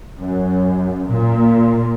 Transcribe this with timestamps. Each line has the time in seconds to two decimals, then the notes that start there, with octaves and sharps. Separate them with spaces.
0.19 F#2
1.08 A#2